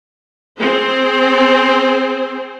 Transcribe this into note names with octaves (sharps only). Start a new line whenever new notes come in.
C4 G#4 C5